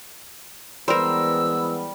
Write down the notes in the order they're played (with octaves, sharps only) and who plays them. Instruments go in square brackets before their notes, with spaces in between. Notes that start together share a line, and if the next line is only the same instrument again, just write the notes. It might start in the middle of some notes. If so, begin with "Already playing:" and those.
[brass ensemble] E3 G#3 B3 [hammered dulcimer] G3 [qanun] A#4 C5 [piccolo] E6